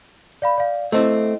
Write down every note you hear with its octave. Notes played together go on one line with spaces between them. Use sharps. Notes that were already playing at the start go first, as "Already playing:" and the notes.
D5 F5 B5
D5 F5
A3 C4 E4 D#5